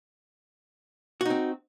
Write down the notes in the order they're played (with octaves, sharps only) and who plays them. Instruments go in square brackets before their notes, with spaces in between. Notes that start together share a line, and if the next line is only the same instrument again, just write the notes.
[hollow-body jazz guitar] F#4
D#4
C4